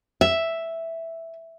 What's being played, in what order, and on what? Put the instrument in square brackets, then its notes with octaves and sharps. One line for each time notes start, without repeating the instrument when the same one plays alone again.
[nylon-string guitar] E5